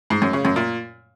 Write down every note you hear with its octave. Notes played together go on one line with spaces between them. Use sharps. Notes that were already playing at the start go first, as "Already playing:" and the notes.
G#2
F#2
C#3
F#2
A#2